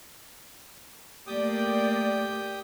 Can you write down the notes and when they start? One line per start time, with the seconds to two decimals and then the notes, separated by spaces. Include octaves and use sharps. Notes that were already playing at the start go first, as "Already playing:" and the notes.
1.27 A3 A#3 G4 D5 G5 D#6